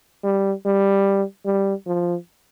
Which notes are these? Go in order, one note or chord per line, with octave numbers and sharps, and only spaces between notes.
G3
G3
G3
F3